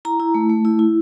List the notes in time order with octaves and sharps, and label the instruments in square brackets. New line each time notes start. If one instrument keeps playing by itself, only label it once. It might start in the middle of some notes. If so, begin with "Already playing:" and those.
[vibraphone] E4 A#5
E4
A3
A3
E4
E4